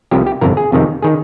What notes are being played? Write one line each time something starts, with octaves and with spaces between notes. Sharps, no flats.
C2 C3 F3 G4
G4
G1 F2 C3 A#4
G#4
F2 C3 D#3
D#3 G#4